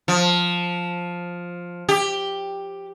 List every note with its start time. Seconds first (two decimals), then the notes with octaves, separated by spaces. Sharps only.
0.08 F3
1.89 G4